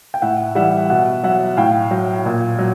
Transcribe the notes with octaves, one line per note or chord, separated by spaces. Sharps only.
G5
A2 E5 F#5
E3 G3 E5 F#5
B2 E5 F#5
F#3 E5 F#5
A2 F5 G5
F#3
A#2
F#3